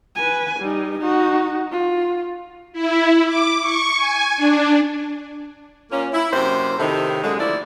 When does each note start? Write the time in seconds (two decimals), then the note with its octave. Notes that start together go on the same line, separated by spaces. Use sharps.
0.16 B4 G#5
0.60 G3 D#4
0.99 D#4 F#4
1.72 F4
2.73 E4
3.26 D6
3.62 C#6
3.97 G#5
4.37 D4
5.91 A#2 A#3 C#4
6.13 E4
6.33 F#2 C3 A#3 C5
6.78 A2 C3 D#3
7.23 F#2 A2 D3 G#3
7.38 D3 F3 A3 A#3 E4 D5